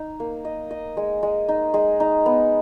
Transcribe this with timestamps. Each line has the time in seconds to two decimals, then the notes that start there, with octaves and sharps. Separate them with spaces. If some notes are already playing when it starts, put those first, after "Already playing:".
Already playing: D#4
0.20 A#3
0.45 D#5
0.71 D#5
0.97 G#3
1.23 G#3
1.48 D#4
1.74 G#3
2.00 D#4
2.26 B3